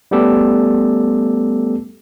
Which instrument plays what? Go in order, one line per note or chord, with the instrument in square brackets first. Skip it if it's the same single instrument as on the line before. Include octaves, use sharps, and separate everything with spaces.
[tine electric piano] G3 A3 B3 C#4 G4 A4